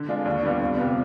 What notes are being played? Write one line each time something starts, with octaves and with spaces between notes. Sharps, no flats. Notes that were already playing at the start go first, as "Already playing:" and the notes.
Already playing: D3
G#3 D4 F4
D#2
D3 G3 B3 F4
F2
C3 G3 B3 F4